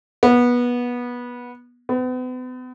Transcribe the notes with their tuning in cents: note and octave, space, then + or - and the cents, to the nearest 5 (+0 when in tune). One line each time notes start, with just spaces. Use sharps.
B3 -20
B3 +40